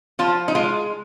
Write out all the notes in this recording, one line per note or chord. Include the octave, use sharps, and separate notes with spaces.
F3 F4
D#4
G#3 F4